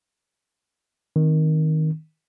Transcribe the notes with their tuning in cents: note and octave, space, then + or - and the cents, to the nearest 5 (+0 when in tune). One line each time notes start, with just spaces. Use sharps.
D#3 +10 C4 +0